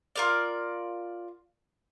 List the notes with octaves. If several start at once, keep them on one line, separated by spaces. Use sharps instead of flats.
F4 A#4 D5